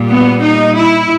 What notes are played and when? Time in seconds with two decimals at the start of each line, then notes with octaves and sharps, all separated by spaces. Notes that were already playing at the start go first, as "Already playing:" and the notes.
Already playing: A#2 G3
0.08 B3
0.42 D#4
0.75 E4